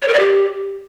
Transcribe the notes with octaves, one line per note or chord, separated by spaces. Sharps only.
C#5
A#4
D5
G4